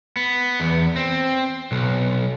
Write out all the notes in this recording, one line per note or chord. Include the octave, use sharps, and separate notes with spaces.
B3
E2
C4
B1